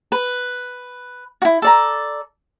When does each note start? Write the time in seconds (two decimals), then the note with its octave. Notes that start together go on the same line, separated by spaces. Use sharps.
0.12 B4
1.42 E4 F#4
1.62 A4 D5 A#5